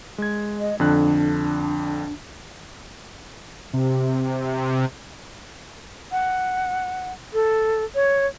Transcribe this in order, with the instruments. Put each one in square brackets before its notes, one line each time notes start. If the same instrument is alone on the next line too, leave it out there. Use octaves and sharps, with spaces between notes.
[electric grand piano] G#3 G#6
[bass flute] D#5
[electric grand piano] F2 D3 F#6 [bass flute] D4
[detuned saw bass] C3
[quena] F#5
A4
C#5